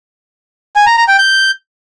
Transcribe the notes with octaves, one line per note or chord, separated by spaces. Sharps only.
G#5
A#5
A#5
G5
G6